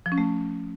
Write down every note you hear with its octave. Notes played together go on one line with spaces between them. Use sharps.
F3
C#4
A3